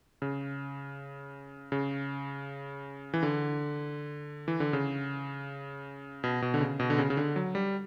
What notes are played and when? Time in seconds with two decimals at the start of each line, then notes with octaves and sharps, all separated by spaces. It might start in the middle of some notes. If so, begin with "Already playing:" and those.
0.22 C#3
1.72 C#3
3.14 E3
3.23 D3
4.48 E3
4.60 D3
4.73 C#3
6.24 B2
6.42 B2
6.54 D3
6.60 C#3
6.80 B2
6.90 D3
6.98 C#3
7.10 C#3
7.17 D3
7.36 F#3
7.55 G3